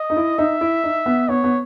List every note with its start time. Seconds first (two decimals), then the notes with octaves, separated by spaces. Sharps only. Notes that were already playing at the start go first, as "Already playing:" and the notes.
Already playing: D#5
0.10 D#4
0.17 E4
0.38 D#4 E5
0.61 E4
0.84 D#4
1.06 B3
1.29 B3 C#5
1.44 B3